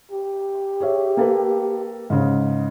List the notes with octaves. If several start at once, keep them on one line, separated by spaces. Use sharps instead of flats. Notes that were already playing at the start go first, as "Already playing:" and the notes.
G4
G#4 C#5 E5
A#3 A4 B4
G#2 C#3